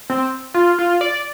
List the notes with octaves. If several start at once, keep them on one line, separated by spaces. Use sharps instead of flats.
C4
F4
F4
D5